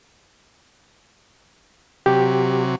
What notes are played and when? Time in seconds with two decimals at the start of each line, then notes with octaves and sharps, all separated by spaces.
2.06 C3 F#3 G4